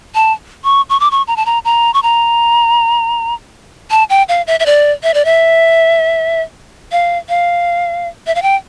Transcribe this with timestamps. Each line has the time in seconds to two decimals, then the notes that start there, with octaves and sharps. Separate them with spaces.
0.15 A5
0.64 C#6
0.90 C#6
1.00 D6
1.11 C#6
1.27 A#5
1.37 A5
1.46 A#5
1.65 A#5
1.94 C#6
2.03 A#5
3.91 A5
4.10 G5
4.29 F5
4.47 E5
4.60 E5
4.66 D5
5.03 E5
5.14 D5
5.25 E5
6.92 F5
7.29 F5
8.27 E5
8.35 F5
8.42 G5